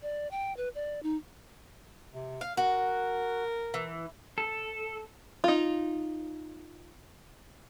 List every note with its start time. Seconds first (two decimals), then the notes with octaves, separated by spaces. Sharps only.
0.02 D5
0.31 G5
0.57 B4
0.75 D5
1.03 D#4
2.13 C3
2.41 F5
2.57 F#4 A#4
3.74 E3
4.38 A4
5.44 D#4 F4